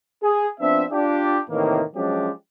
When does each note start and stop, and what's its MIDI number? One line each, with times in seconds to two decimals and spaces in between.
0.22 0.46 68
0.59 0.84 53
0.59 0.84 59
0.59 0.84 60
0.59 0.84 62
0.59 0.84 76
0.90 1.39 62
0.90 1.39 65
0.90 1.39 67
1.49 1.81 45
1.49 1.81 48
1.49 1.81 51
1.49 1.81 52
1.49 1.81 58
1.95 2.30 53
1.95 2.30 54
1.95 2.30 56
1.95 2.30 61
1.95 2.30 62
1.95 2.30 67